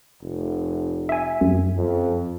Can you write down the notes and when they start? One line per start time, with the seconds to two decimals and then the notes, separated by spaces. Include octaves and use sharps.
0.22 F1
1.09 E5 G#5
1.41 F#2
1.76 F2